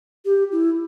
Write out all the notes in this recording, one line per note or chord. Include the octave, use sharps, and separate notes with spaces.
G4
E4